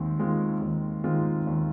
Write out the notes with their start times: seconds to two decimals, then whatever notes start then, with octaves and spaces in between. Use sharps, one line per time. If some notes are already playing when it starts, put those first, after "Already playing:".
Already playing: D#2 D#3 G#3 C4
0.19 D#3 G#3 C4 F4
0.62 D#2
1.04 D#3 G#3 C4 F4
1.47 D#2